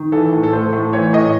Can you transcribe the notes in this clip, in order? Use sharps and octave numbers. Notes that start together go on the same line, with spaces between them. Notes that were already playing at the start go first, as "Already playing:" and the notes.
Already playing: D#3
E3 A4
A2
A4
A2 C5
A2
E3 C#5
A2 D#5